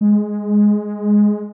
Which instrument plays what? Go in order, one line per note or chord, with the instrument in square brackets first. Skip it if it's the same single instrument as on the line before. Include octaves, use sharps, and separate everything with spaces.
[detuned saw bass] G#3